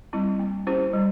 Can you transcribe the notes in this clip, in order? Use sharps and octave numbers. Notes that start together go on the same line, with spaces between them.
G3 C4 E4
A#3
C#4 E4 G4 C5
G3